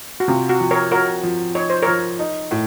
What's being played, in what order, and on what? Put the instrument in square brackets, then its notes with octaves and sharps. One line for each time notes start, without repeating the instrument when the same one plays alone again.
[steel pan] F#4
[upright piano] C3 [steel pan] F4
[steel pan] F#4
[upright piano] F3
[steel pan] A#4 C#5
[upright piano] F#4 [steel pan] A#4 C#5
[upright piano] F3
[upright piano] D#4 [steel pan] C#5
[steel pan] C5
[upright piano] F3 [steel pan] A#4 C#5
[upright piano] D#4
A2